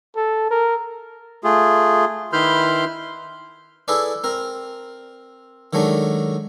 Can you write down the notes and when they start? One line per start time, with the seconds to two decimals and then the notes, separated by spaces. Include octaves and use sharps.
0.16 A4
0.51 A#4
1.44 A3 F4 G#4
2.33 D#3 E4 B4 C6 F6 G6
3.88 E4 G#4 A4 B4 D5
4.24 C4 A#4
5.73 D#3 F#3 G#3 A3 D4